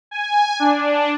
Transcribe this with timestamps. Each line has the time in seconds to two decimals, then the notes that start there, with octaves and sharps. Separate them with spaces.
0.11 G#5
0.59 D4